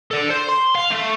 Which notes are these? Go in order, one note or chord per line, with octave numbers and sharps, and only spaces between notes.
A4 D5
C5
C6
F5
A3